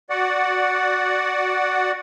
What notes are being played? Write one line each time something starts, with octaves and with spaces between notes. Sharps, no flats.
F#4 D5 F#5